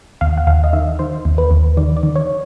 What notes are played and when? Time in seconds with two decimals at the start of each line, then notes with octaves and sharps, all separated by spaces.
0.21 D#2 F5
0.38 F#5
0.47 D#2 F5
0.64 D#5
0.73 D#3 E5
0.99 D#3 C5
1.25 D#2
1.38 B4
1.51 D#2
1.77 D#3 D5
1.97 D5
2.03 D#3
2.16 C#5